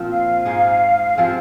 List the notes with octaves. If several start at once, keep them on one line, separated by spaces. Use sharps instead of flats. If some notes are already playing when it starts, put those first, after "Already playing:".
Already playing: A#2 F3 C4 F4
F5
G#2 G#3 D#4
C3 F3 G#3 C4